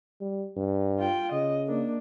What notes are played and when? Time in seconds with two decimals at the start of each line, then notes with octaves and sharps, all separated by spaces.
0.21 G3
0.57 G2
0.98 F4 G5
1.32 C#3 D#5
1.67 A#3 D4